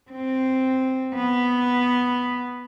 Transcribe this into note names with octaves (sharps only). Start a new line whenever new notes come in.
C4
B3